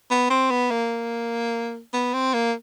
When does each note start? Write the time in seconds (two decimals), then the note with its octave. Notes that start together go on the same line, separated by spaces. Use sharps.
0.11 B3
0.30 C4
0.50 B3
0.71 A#3
1.94 B3
2.13 C4
2.34 A#3